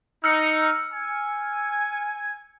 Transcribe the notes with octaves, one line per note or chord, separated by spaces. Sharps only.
D#4 E6 F6 C#7
G#5